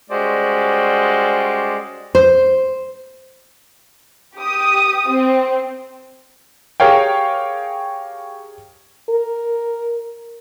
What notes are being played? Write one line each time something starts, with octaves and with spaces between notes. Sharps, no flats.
G3 G#3 C#4 F#4 C5 D5
C5
G4 D#6
C4
G4 G#4 A#4 C#5 F5 G5
A#4